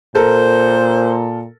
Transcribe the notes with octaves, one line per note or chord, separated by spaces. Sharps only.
A#2 A4 A#4 C5